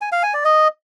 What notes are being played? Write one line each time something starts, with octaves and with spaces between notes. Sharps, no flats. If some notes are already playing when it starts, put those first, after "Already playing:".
G#5
F5
G#5
D5
D#5